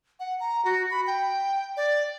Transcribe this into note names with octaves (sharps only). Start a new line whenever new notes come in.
F#5
A#5
F#4
B5
G5
D5